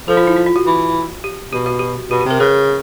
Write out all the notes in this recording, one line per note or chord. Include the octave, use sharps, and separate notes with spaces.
F3 A4
F4
E4
F4
F4
F#4
E3
G4
B2 G4
F#4
G4
B2 G4
G4
C3
A#4
C#3 B4